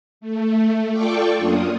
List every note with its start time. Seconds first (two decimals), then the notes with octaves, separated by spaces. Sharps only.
0.21 A3
0.91 F4 A4 D5 G5 C#6 D6
1.37 F#2 A#3 D4 F4 D#6